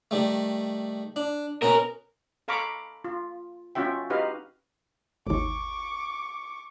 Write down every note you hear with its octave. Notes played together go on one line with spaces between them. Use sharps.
D#3 G3 A3
D4
B2 B3 C#4 A#4
A4 F5 A#5 B5 C#6 D6
F4
C#4 F4 F#4 E5 G5
D#4 F#4 G4 B4 D#5 F5
G#1 D#2 C#6 D6